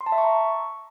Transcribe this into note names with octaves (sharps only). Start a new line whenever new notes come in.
C6
A5
E5
C#6
A#5